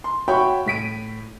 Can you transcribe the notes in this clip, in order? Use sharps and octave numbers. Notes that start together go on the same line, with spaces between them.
C6
F#4 C#5 E5 G5 B5 C#6
A2 B6 D7 D#7